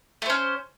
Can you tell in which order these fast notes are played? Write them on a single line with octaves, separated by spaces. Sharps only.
A3 C5 C#4